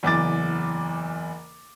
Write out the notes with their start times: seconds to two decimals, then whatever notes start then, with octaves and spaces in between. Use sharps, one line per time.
0.03 F#1 E2 D6 A6